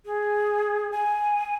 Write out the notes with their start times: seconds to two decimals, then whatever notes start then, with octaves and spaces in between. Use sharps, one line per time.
0.06 G#4
0.92 G#5